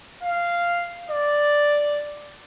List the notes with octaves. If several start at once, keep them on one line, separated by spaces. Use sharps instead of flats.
F5
D5